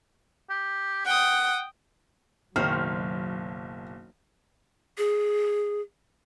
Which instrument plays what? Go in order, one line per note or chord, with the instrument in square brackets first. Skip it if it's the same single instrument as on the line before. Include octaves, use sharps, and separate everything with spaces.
[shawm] G4
[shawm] F#5 [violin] G5 D#6
[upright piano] F#1 B1 [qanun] D#3 C5 C#5 [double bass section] F#3 [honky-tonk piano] F6
[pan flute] G#4